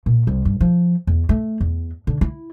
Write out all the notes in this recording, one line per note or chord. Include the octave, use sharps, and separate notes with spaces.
A#2
C2
G2
F3
E2
A3
E2
D3
E4